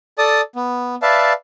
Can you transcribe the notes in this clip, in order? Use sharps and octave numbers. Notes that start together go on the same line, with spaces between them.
A4 D5 A5 D#6
B3
B4 D5 E5 F5 A5